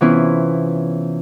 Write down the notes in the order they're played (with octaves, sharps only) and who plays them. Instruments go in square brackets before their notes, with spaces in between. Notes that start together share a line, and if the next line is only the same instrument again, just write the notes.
[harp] C3 E3 B3 C#4 E4 F4